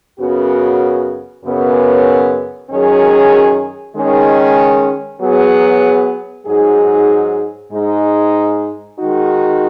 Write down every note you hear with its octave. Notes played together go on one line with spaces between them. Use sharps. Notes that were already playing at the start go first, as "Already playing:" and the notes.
F#2 C#3 B3 F#4
F#2 C#3 B3
F#2 D#3 F#3 C#4 G#4
D#3 G#3 C#4
F#3 B3 G#4
G#2 F#3 D#4 G#4
G#2 G#3 D#4
D#3 G#3 D#4 F#4